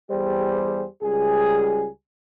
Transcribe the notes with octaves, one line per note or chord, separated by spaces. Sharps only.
E2 G3 G4 G#4 C5
C#2 G3 G#4